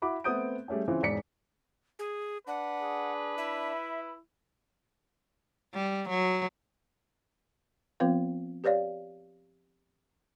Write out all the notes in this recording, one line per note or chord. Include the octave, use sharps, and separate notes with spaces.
E4 F#4 B5 D6
A3 B3 C4 D#6 G6 D7
G3 A3 C#4 G#4
C#3 E3 C4 F4
E1 G#2 D5 B6 C#7
G#4
D4 B4 F#5
G#4
E4 E5
G3
F#3
F3 B3 C4 F4 B4 F5
G4 B4 C#5 D5 F5